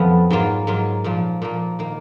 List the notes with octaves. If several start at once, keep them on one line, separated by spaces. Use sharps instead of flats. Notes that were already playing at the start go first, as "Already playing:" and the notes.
Already playing: F2 F3 B3
G#2 F#3 A#3 F4
G#2 F#3 A#3 F4
A#2 F3 A#3
A#2 F3 A#3
D#3 A#3